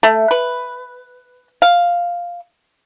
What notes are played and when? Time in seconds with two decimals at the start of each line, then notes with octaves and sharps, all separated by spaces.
0.03 A3
0.31 B4
1.62 F5